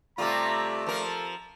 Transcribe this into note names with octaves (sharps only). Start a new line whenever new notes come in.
C3 G3 A3 F4 D5 A#5
F3 A4 A#4